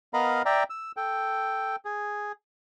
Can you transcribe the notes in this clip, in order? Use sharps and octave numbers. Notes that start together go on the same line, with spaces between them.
B3 A#4 D#5 F5 A#5 B5
D5 E5 G5 A#5
E6
A4 G5
G#4